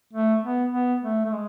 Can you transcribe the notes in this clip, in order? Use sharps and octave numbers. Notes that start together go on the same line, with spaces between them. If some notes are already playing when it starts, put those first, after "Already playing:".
A3
B3
B3
A3
A3
G#3